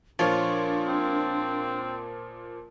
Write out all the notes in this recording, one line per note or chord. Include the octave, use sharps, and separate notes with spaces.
A#2 F3 D4 F4 C#5
C4